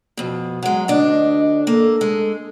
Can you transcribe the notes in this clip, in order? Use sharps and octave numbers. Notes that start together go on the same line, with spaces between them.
F2 B2
F#3 G#3 F#5
D2 D4 D#5
A#3 A4
G#3